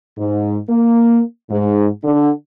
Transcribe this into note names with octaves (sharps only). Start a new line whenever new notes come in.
G#2
A#3
G#2
D3